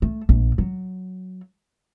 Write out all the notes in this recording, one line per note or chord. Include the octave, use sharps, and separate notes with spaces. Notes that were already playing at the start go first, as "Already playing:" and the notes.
A3
A#1
F#3